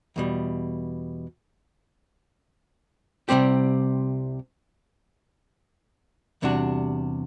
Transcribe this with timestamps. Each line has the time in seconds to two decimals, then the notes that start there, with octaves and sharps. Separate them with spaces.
0.16 E2 B2 G3
3.29 C2 C3 G3 C4 G4
6.42 E2 C3 G3 D4 F#4